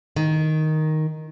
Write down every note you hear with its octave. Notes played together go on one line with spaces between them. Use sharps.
D#3